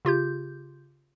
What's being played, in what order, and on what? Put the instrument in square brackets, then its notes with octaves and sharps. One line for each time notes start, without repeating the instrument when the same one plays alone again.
[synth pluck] C#3 F4 G4 G6